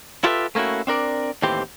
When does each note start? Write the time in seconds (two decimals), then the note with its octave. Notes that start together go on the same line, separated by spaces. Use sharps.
0.24 E4 F4 G4 A4 B4 E5
0.55 A3 A#3 C#4 E4 F#4
0.87 C4 D4 A#4 D5
1.42 D#2 A2 E3 C4 G4 C6